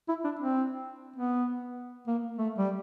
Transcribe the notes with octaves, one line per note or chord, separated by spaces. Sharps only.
E4
D4
C4
B3
A#3
A3
G3